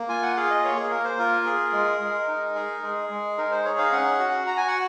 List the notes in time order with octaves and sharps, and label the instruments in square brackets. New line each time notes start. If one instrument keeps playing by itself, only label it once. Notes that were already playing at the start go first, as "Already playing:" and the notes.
Already playing: [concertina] A#3
F4 G#5
F#5
G#4 F5
D#5
A#3 C#5
G#4
A#3 A#4
C5
F4 A#4
G#4
G#3
G#3
D#4
G#4
G#3 G#4
G#3
D#4 A#4
C5
G#4 C#5
F5
C#4 F#5
F#4
F#4 A#5
G#5
F#5